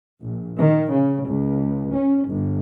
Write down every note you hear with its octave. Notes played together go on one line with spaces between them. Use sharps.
A#1
D#3
C#3
C#2
C#4
G1